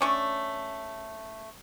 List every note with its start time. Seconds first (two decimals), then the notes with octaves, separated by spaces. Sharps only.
0.01 A3 C#4 D4